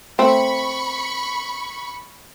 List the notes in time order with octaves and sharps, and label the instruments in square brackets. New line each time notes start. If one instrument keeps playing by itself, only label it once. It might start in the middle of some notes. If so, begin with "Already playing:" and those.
[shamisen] A3 C4 [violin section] B5 C#6